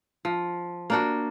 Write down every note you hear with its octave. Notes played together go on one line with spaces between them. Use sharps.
F3
A#3 D4 F#4